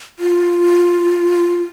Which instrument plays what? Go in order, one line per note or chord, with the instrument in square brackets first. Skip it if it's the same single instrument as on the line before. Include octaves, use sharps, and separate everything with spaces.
[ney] F4